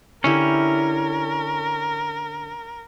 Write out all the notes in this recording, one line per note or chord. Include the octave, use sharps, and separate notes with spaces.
D3 C#4 E4 G4 A#4